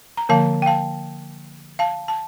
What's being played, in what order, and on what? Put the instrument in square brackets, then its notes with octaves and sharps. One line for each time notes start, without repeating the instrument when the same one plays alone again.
[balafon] A#5
D3 F3 A#3 F5 A5
G5
F5 A5
F5 A5
A5